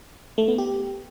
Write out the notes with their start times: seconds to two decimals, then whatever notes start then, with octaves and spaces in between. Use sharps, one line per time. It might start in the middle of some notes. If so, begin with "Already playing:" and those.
0.38 A3
0.48 B3
0.58 G4